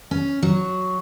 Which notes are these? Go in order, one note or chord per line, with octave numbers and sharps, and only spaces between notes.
C#4
F#3